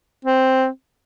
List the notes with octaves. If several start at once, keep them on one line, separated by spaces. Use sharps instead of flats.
C4